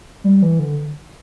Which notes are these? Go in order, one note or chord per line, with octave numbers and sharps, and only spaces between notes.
G3
E3
D3